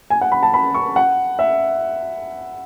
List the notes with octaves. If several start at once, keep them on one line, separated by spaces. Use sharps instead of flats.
G#5
F#5
B5
A5
B5
C#6
F#5
E5